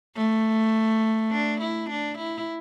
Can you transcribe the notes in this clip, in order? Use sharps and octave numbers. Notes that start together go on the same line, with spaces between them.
A3
D4
E4
D4
E4